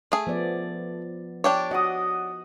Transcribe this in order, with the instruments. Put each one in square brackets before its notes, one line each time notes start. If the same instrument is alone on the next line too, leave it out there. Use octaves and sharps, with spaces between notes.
[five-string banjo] A3 G#4
[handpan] F3 B3 D5
[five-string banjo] D4 G4 C#5
[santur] F#4 F#5 D#6 [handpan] D#5